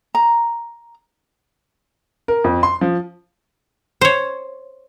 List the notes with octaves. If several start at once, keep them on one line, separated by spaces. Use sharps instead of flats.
A#5
A#4
F2
C6
F3
C5 C#5